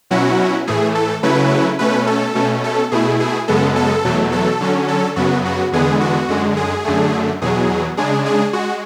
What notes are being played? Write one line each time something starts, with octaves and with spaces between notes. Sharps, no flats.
B2 F#3 C#4 E4 F#4
A2 E3 A3 G#4
A4
C#3 F#3 A3 C#4 E4 B4
B2 A3 C#4 B4
A4
B2 A3 C#4
A4
B2 A3 E4 G#4
G#4
F#2 C#3 G#3 B3 A4
A4
E2 B2 F#3 A3
A4
D3 F#3 C#4
A4
F#2 C#3 F#3 B3 F#4
F#4
E2 D3 G#3 B3 G#4
F#4
F#2 D3 G#3
G#4
F#2 D3 A3
E2 B2 F#3 G#4
C#3 G#3 D4 G#4
G#4
G#3 F#4